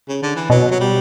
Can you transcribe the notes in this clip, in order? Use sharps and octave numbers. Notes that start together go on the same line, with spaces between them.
C#3
D3
E3
B2 F#3
F#3
G3